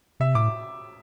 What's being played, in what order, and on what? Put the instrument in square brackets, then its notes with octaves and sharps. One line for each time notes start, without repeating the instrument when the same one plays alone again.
[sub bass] C3 [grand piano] E5
[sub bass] A2 [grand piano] D6